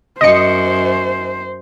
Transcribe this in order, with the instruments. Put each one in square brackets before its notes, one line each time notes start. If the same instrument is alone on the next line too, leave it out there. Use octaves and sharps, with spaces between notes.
[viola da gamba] F#2 [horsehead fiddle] C5 [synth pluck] D#5 C#7